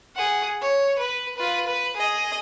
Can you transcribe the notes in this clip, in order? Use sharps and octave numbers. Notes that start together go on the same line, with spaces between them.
G#4 F#5
C#5
B4
F4 B4
B4
G#4 D#5